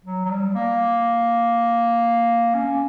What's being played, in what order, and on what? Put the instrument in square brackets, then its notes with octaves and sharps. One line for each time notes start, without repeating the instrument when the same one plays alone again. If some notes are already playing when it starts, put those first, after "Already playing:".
[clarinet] F#3
F#3
G3
A#3
C#4